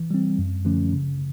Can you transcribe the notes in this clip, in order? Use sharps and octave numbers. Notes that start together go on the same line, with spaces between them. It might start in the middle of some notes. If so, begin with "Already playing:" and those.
Already playing: E3
G3 C4
F#2
D3 F3 A3 C#4
C#3